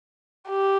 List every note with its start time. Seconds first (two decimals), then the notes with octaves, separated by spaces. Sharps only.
0.49 G4